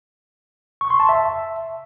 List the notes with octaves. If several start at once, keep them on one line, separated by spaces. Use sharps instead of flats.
C#6
C6
A5
E5